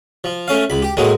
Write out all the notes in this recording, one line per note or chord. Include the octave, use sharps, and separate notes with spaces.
F3
A3 C#4 F5
C#2 B5
G4
A2 F#3 G#3 A#3